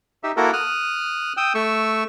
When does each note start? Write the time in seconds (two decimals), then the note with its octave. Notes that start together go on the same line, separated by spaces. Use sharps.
0.23 D#4 G4 E5
0.37 A#3 E4 F#4 A4 A#4
0.53 D#6 F6 F#6
1.37 G5 D#6 E6
1.55 A3 C#6 E6